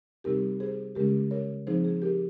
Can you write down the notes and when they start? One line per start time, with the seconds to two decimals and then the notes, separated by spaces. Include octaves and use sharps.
0.24 C3 G3 C4 D#4 G4 A#4
0.60 G#4 C5
0.95 C#3 G#3 C#4 G4 A#4
1.31 A#4 C#5
1.67 F3 C4 D#4 G#4 C5
1.85 G#4
2.02 G4 A#4